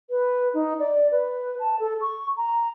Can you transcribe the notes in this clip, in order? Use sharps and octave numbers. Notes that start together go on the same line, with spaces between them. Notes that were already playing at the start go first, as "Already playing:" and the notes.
B4
D#4
D5
B4
A5
A4
C#6
A#5